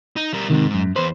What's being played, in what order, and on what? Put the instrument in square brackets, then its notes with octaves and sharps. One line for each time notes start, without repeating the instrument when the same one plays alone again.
[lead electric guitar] D#4
G3 A#4
[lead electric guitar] D2 G#2 [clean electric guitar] C3 D#3
[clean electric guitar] F#2
[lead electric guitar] E2 B4 [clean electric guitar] C5